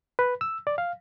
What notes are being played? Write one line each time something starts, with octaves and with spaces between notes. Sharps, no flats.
B4
E6
D5
F5